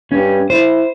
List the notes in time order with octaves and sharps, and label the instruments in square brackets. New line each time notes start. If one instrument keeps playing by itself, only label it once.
[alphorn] G2 [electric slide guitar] C#4
[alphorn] E4 [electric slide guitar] C5